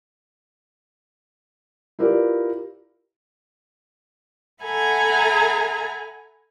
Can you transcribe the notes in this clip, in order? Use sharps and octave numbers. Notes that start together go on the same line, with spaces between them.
E4 F4 G4 A#4 B4 D5
A4 E5 F#5 G#5 A#5 B5